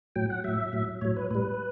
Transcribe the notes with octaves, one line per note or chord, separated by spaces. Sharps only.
A2 F#3 G5
F#5
A2 F#3 E5
A2 F#3
A2 F#3 C#5
B4
A2 G3 B4